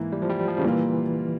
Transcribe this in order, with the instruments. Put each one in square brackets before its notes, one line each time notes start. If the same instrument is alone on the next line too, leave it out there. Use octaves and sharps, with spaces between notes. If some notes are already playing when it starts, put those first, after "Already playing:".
Already playing: [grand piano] G#2 E3 A#3 E4
[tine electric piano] G3
F3
G3
F3
C#3
[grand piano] A#2 G3 A#3 F4 [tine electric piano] E3